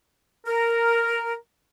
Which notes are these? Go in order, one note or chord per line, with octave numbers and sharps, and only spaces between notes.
A#4